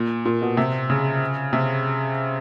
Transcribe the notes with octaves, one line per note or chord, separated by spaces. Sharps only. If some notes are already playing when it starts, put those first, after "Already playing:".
Already playing: A#2
A#2
B2
C3
C#3
C3